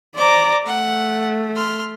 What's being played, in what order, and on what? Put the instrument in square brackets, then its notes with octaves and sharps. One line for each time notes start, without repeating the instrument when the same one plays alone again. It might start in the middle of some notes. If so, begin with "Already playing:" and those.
[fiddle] C5 D6 [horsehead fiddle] D5 A#5
[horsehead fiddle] A3 [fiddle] F#5
[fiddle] C6 F6